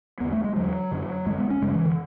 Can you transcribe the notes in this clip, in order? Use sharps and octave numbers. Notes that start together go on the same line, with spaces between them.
E2 D3 B3
A3
G#3
E2 D3 F#3
F#2 D3
F#2 D3 G#3
B3
C#4
F#2 C#3 G#3
E3
D3